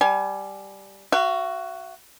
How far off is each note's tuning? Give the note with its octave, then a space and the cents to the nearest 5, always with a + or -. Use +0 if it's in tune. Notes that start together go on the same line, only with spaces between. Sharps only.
G3 +0 G#5 +30
F#4 +5 F5 -45